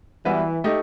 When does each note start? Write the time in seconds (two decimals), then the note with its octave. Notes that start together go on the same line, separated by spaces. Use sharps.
0.25 E3 G3 B3 F#4 B4 E5
0.64 A3 D#4 G4 D#5